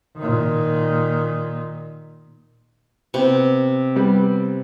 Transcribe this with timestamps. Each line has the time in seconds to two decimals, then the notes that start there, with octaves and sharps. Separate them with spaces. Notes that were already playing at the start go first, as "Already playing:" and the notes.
0.17 A#2 D#3
3.14 C3 B3
3.96 G3 B3